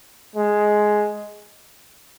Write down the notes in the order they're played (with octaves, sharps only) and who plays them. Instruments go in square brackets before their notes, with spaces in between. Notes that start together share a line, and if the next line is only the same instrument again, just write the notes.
[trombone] G#3